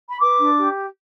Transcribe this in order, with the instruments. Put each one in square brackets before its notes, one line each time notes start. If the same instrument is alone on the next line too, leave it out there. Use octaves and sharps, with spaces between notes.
[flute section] B5
B4 D6
D4
G4